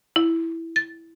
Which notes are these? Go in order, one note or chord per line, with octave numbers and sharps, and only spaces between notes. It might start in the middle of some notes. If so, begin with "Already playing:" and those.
E4
A6